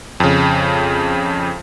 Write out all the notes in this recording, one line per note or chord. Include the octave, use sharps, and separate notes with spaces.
F2 C#3